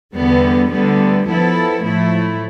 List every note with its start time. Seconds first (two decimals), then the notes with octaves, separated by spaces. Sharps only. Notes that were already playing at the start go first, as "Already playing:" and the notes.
0.15 E2 D3 G3 B3
0.71 D2 D3 G3 B3
1.27 F3 B3 E4 A4
1.83 A2 F3 A3 E4